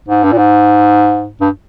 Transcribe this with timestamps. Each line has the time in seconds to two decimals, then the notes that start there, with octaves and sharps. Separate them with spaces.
0.08 G#2
0.23 G2
0.32 A#2
0.38 G#2
1.41 G2